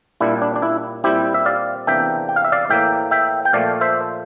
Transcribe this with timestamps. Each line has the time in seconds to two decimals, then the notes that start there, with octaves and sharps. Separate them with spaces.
0.20 A#2 G3 D4 E4
0.42 D4
0.56 D4
0.62 E4
1.04 A#2 G3 C4 E4 G4
1.34 E5
1.46 D5 F5
1.87 E2 C3 E3 A#3 D4 E5 G5
2.29 G5
2.36 F5
2.44 E5
2.52 D5 F5
2.70 A2 E3 A#3 E5 G5
3.11 E5 G5
3.45 G5
3.53 A#2 F3 A3 D5 F5
3.81 C5 E5